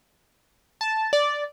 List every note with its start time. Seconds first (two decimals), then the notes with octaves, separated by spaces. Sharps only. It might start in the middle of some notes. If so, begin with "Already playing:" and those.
0.81 A5
1.13 D5